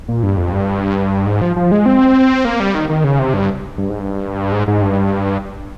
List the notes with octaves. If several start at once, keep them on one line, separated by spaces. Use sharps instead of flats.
A#2
G2
F2
G2
G#2
F3
F3
G#3
C4
A#3
G3
D#3
D#3
C#3
C3
G2
G2
G#2
G2
G#2
G#2
G2